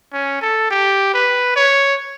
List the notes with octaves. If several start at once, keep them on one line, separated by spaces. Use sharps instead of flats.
C#4
A4
G4
B4
C#5